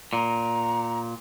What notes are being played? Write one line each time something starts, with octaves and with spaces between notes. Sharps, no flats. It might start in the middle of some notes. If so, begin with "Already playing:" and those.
A#2 A#5